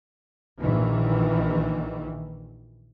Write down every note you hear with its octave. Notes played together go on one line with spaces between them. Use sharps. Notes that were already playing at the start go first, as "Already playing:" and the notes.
A#1 D#3 E3